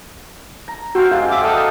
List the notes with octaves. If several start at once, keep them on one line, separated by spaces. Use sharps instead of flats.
A#5
C4 F#4 C5 F5
F#2 G#3 F5
E5 D6
D4 D#4 A4 D#5 F5 D#6